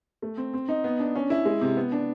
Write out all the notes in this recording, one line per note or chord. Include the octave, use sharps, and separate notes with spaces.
A3
C4
C4
D#4
B3
D4
C#4
E4
G#3
C3
B3
D4